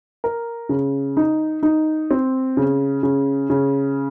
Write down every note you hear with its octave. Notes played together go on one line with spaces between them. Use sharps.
A#4
C#3
D#4
D#4
C4
C#3
C#3
C#3